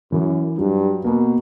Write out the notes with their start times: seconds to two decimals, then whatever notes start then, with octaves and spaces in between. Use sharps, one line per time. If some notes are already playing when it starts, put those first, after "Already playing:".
0.12 F#2 E3
0.58 G2 F#3
1.05 B2 A#3